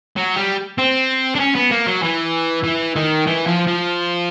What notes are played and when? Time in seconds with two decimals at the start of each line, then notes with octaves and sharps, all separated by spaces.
0.17 F#3
0.36 G3
0.78 C4
1.35 D4
1.40 C#4
1.55 B3
1.71 A#3
1.87 F#3
2.03 E3
2.64 E3
2.96 D#3
3.27 E3
3.47 F3
3.67 F3